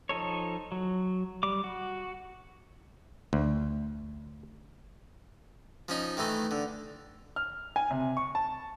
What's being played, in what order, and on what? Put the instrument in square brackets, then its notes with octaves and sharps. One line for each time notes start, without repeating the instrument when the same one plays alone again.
[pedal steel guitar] F3 D#4 A4 C#5
F#3
G3 D6
F#4
[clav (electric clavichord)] D2
[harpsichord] F3 C#4 D#4
D#3 E3 A3 D#4
D3
[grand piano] F6
G#5
C3
C#6
A5